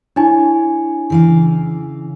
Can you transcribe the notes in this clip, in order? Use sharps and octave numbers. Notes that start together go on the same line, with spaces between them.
D4 E4 C#5 G#5
C#3 E3 F5